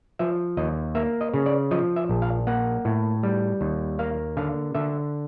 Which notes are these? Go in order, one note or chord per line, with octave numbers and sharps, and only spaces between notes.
F3 E5
D#2 D#5
A#3 E5
D#5
C#3
D5
F3 D#5
E5
A#1
F5
A#3 F#5
A2
G3
D#2
A#3 F5
D3 F5
D3 E5